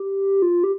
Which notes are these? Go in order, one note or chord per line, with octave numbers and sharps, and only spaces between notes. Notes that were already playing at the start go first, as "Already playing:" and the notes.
Already playing: G4
F4
G4